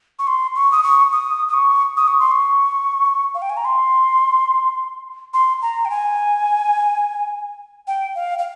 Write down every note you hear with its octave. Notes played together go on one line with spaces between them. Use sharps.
C#6
C6
C#6
D#6
C#6
D#6
D#6
C#6
D#6
C#6
C6
C#6
F5
G5
G#5
A#5
C6
C6
A#5
G5
G#5
G5
F5
F5